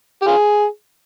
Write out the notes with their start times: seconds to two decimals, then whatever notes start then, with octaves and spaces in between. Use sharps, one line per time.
0.22 G4
0.27 F4 G#4